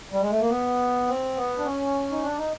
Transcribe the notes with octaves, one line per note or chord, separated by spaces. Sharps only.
G3
G#3
A3
A#3
B3
C4
B3
D4
C#4
D#4
D4
D#4